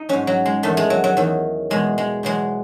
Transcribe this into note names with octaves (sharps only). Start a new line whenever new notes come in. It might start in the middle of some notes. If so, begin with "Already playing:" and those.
Already playing: D#4
G#2 F#3 C#4
F#3
G#3
E2 D#3 F#3 A3
G#3
F#3
F#3
E2 D#3 F#3
E2 B2 F#3 G#3
G#3
E2 B2 F#3 G#3